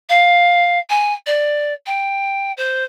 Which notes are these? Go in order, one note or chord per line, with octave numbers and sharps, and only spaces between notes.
F5
G#5
D5
G5
C5